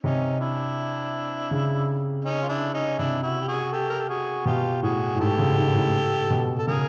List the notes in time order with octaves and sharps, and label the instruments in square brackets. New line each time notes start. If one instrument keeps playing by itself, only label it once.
[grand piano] C3 [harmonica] C#4 D#4
[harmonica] D4 E4
[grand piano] C#3
[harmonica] C#4 D#4
F4
D4 E4
C#4 D#4
[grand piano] C3 [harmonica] D4 E4
[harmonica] E4 F#4
G4
F#4 G#4
G4 A4
A#4
A4
F#4 G#4
[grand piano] B2 [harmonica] F4 G4
[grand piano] A2 [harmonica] F#4 G#4
[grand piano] A2
[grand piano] G#2 [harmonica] G4 A4
[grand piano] C#3
D#3
A2
B2
[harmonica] A4
[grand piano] C#3 [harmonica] G#4 A#4